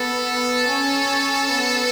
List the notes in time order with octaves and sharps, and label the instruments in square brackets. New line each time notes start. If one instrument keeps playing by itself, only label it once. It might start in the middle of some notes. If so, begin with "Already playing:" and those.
Already playing: [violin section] B3 [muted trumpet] A4
[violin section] C#4
B3